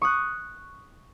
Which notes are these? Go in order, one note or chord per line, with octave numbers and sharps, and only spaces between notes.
C#6 D#6 F#6